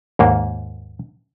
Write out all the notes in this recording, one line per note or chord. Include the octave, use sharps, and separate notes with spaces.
D#2 G#2 A#3